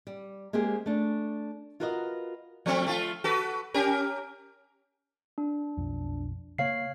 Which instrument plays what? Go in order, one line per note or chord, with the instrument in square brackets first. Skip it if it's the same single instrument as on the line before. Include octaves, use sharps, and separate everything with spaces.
[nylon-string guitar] G3
G#3 A#3 C4 G4 G#4
A3 D4
F4 F#4 A#4 B4 D5 D#5
[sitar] F3 A3 C4
A3 F4
F#4 A4 B4
C#4 G4 A#4
[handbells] D4
[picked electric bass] B1 F2
[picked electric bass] C#3 A#3 [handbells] C#5 F5 C7